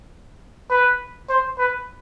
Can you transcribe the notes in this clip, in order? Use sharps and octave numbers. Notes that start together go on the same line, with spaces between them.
B4
C5
B4